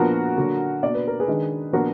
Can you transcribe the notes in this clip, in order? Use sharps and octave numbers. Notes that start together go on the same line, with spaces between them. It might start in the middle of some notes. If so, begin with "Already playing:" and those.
Already playing: A#2 F3 B3 D4 F#4 A#4
D3 F#3 A#3 D4
B2 A#3 D4 D5
B4
A#4
G#4 B4
D#3 G#3 D4
A#2 F3 B3 D4 F#4 A#4